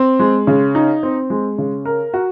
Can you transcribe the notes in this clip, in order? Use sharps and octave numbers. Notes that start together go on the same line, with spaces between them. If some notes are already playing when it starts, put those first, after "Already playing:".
Already playing: C4
G#3
C#3
D#4
C4
G#3
C#3
A#4
F#4